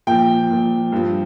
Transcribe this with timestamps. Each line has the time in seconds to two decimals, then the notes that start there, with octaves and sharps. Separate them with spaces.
0.07 A#2 F3 G5
0.50 A#2 F3
0.92 G2 F3